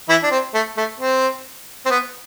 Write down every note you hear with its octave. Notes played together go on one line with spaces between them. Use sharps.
E3 E4
D4
C4
A3
A3
C4
C4
B3